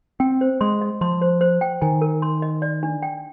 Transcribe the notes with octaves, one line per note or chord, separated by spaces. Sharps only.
C4 G5
C5
G#3 C6
D#5
F3 C6
C5
C5
G5
D#3 G#5
A#4
C6
D#5
D5
D4
G5